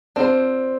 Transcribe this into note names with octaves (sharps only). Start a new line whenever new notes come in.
C4 D4 F4 C5